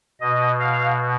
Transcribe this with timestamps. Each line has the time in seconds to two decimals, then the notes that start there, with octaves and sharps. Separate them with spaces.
0.21 B2 D#5
0.60 F5